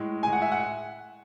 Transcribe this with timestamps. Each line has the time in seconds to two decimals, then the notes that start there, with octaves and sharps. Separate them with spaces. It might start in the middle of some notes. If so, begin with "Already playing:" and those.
Already playing: A2 G#3
0.23 A2 G#3 G#5
0.33 F#5
0.42 E5
0.52 F#5